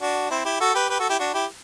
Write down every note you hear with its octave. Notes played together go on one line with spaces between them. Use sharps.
D4 F#4
C4 E4
E4 G4
F#4 A4
G4 B4
G4 B4
F#4 A4
E4 G4
D4 F#4
E4 G4